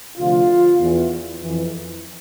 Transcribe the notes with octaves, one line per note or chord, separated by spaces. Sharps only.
D2 C3 F3 F4
E2 E3
F2 E3